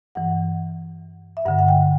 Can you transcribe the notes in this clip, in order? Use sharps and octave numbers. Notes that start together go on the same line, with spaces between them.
G2 E3 F#5
E5
G2 D3 F#5
F#5
G5